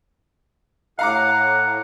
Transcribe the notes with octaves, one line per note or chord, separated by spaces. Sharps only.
A2 F5 F#5 A#5 D6